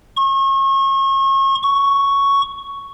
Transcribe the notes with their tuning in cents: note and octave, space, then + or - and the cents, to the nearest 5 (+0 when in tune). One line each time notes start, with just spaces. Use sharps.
C#6 -35
C#6 +5